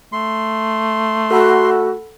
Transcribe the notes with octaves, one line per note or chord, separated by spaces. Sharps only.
A3 C6
F#4 A4 F#5 B5